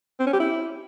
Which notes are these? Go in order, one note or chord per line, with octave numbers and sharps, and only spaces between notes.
C4
C#4
G4
E4